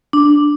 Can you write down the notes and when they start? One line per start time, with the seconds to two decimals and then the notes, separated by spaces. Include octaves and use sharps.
0.13 D4